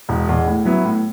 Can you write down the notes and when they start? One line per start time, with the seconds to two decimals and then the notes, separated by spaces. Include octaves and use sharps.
0.09 E1
0.29 E2 B2
0.48 A2
0.65 F#3 B3 E4
0.84 A2